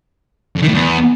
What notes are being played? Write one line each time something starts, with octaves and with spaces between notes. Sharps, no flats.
F2
D#3
A2
E2